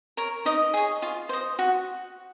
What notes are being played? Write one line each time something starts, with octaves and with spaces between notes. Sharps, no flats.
A#4 C#5
D#4 D#5
G#4 C#5
F4
C5 D#5
F#4